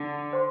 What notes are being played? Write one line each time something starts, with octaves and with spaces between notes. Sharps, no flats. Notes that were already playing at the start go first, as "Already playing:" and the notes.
Already playing: D3
C5 G5 C6